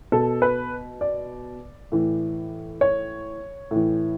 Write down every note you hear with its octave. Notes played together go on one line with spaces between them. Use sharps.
B2 A4
B4
D5
A2 E3
C#5
A2 E3